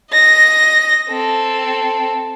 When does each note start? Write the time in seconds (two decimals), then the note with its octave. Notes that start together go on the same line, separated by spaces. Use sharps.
0.11 D#5 A#6
1.09 C4 A4